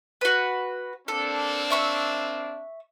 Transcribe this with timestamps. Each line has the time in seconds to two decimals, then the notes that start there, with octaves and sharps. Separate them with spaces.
0.21 F#4 B4
1.08 A#3 C4 D4 A4
1.70 E5 C#6 E6